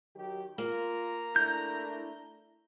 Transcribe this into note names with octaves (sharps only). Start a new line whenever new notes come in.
D#3 F#3 G4
A#3 F4 A#5
A3 D4 E4 G6